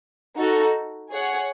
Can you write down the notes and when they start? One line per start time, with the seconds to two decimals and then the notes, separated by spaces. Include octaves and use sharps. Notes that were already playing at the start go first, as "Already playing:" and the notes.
0.36 D#4 F#4 A4
1.11 G#4 C#5 F#5